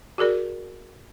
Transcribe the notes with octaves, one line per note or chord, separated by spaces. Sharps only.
F#4 G#4 A#4 D5